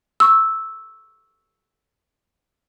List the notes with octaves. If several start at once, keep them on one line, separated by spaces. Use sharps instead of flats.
C#6 E6